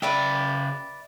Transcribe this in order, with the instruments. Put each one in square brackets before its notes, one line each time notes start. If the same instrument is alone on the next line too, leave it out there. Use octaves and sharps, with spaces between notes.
[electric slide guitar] C#3 G5 [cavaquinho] B4 D5 E5